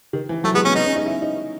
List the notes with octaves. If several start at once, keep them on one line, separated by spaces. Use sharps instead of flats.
D#3
E3
F#3 A3
G#3 B3
B3 C#4
B3 D#4
C#4
D#4
E4
D#4